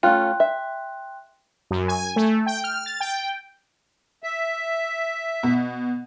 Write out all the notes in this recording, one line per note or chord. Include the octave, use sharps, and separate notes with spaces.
A3 C#4 F4 G5 C6 F#6
E5
F#2
G#5
A3
G5
F6
A6
G5
E5
B2